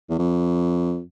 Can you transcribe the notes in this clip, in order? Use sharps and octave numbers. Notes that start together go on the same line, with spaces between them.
E2
F2